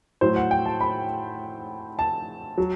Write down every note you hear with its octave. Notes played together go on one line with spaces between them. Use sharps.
A2 F#3 C5
F#5
G5
A5
B5
A5
F#3